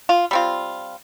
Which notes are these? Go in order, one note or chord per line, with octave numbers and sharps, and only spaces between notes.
F4
G3 C4 F4